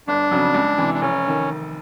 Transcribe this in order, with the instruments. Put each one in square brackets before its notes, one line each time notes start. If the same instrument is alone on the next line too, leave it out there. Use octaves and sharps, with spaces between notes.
[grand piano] G1 [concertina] D4
[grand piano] F2 C#3 F#3
C#2
C3 E3
[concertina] D4
[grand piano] F1 [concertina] C#4
[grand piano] D#3